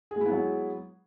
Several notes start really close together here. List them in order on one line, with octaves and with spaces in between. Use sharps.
G#4 G#3 E4 B3 F#3